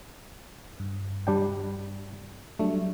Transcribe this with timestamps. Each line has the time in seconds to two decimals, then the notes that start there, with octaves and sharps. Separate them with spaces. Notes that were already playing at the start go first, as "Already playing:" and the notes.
0.80 G2
1.27 G3 D4 G5
2.59 F#3 G3 A3 D4